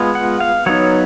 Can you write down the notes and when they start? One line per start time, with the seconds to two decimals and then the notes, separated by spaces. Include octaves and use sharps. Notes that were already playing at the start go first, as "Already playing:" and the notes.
Already playing: G#3 B3 F4
0.15 F#5
0.40 F5
0.66 F#3 B3 D#4 C#5